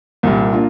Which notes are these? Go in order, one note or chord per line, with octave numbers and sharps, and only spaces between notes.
C2 A#2 G3
A#3 D4 F4